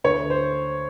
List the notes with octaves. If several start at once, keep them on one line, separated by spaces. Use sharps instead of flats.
D2 C#5
D2
C5